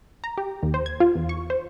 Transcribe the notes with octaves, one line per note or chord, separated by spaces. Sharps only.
A#5
G4
D#2
C5
G#6
F4
E2
C#6
C5